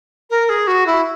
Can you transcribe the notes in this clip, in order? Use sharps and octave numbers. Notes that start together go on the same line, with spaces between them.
A#4
G#4
F#4
E4